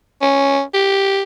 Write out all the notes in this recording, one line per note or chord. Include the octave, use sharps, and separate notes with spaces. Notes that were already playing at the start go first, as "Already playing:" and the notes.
C#4
G4